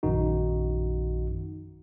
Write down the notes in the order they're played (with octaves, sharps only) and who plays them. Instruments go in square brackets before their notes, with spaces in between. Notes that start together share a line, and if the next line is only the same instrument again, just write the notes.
[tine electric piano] A#1 F#2 D#3 D#4 F#4